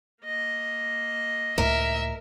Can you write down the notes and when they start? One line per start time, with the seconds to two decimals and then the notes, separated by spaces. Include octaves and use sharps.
0.23 A#3 D#5
1.58 C#2 A2 A#4 E5